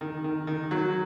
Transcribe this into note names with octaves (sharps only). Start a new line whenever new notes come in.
D#3
D#3
D#3
F#3